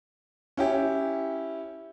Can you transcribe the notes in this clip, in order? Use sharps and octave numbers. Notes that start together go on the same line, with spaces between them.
C#4 E4 G4